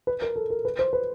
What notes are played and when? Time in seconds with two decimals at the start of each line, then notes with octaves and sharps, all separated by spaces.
0.07 B4
0.22 A#4
0.36 A4
0.50 A#4
0.65 B4
0.79 C5
0.93 B4